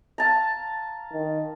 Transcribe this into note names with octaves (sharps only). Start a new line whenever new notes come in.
F5 A5 A#5
D#3